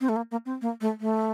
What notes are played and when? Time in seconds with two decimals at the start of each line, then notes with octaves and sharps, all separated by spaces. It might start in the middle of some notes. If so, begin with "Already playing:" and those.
0.01 C4
0.09 A3
0.16 A#3
0.31 A#3
0.46 C4
0.62 A#3
0.81 A3
1.00 A3